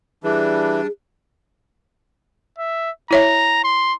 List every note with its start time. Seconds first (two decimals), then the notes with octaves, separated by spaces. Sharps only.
0.24 E3 G3 D4 G#4
2.58 E5
3.11 E4 C#5 E5 A#5
3.64 C6